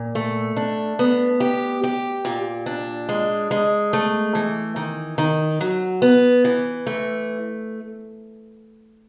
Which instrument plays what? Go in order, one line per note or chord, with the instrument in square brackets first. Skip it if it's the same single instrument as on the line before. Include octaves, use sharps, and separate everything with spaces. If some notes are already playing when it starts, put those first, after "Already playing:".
Already playing: [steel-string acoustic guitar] A#2
A3
D4
B3
G4
G4
A#2
D4
G#3
G#3
A3
E3
D#3
D#3
F#3
B3
E3
A3